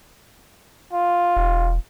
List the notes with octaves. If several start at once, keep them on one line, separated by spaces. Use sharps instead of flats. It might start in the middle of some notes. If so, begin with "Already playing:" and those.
F4
E1